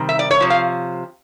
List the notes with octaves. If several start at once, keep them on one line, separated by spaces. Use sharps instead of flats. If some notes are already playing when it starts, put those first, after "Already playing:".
Already playing: C3 D#3 G3
E5
D5
C#5
C3 F3
F5